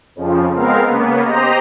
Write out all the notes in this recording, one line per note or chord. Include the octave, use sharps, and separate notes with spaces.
F2 C#3 F3
G#3 B3 C4 A#4 F5
C#3 A#3 B3
G4 C5 D#5 A#5